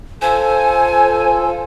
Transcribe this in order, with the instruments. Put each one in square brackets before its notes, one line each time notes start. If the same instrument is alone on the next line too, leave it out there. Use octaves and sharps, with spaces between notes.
[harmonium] F4 A4 [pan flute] C5 [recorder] G#5